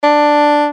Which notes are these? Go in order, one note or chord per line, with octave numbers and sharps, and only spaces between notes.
D4